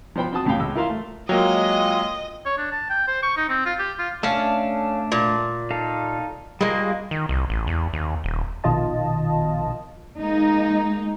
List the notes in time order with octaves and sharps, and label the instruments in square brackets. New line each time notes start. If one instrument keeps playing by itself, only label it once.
[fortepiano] F3 B3 C5 G5 B5
C4 F#4 A5 D#6
C#2 A2 C3 F5 G5
C#2 G#3 E6
E4 F4 A#4 E5 F5 C6
A3
[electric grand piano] F#3 A#3 [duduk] G#3 [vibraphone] F4 F5 G5 [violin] D#5
[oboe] C#5
D4
A5
G5
C5
C#6
D#4
C4
F4
G4
F4
[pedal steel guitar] A3 D4 [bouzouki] C#4 F5
[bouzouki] A#2
[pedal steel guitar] D#4 A4 F5
[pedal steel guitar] G3 F4 G#4 [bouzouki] G#3 A#3
[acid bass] D#3
C2
A1
E2
D#2
D#1
[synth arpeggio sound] A#1 B2 D#3 F4 D#5 A5
[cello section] G#3 A#3 D#4